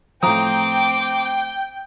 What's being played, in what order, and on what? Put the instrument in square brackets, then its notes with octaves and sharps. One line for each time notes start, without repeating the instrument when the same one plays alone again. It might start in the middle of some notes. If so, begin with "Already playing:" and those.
[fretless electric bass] A2 F3 [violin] C4 D6 [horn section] G5 [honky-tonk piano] A#5 D#6